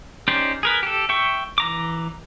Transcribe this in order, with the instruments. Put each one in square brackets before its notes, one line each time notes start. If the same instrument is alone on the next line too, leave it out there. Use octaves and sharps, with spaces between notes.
[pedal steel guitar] C#4 D#4 G4 C5 D5
G#4 A#4 B4
G4 A4
E5 G5 C#6
E3 A#5 D6